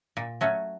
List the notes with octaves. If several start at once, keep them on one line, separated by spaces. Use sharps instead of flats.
A#2
F#3 A3 C#4